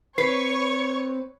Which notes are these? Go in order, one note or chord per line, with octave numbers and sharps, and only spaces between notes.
C4 B4 C#5 C7